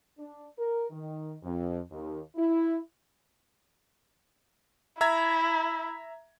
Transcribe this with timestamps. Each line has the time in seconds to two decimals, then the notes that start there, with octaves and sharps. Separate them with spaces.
0.18 D4
0.57 A#4
0.90 D#3
1.42 F2
1.90 D#2
2.36 E4
5.01 E4 E5 A#5 G#6